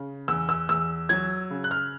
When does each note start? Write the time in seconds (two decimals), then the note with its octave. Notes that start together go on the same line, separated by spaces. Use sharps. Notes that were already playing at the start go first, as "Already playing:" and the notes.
Already playing: C#3
0.28 E2 E6
0.49 E6
0.69 E2 E6
1.09 F#3 G#6
1.51 C#3
1.64 F#6
1.71 F6